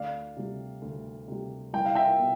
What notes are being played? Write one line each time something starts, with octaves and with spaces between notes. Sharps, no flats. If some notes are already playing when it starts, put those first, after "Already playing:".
Already playing: D2 D5 F5
C3 G3
D2
C3 G3
C2 G5
F5
E5 G5
B2